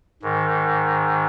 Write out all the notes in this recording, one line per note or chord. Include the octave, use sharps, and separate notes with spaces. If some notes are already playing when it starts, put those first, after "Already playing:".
G#2 D#3